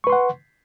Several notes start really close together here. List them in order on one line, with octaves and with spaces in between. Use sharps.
C#6 B4 C6 F#5